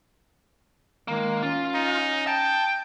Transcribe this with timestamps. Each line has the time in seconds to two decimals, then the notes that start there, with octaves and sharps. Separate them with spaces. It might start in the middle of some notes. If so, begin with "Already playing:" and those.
1.08 D#3 G#3 A#3
1.43 C#4 F4
1.74 D#4
2.27 G5 A5